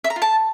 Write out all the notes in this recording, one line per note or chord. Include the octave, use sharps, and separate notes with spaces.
E5
A#5
F4
A5